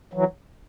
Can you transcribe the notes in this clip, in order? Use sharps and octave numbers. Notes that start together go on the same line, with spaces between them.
E3 F#3